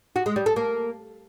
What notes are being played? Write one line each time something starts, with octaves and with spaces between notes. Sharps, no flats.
F#4
G#3
G3
A4
A#3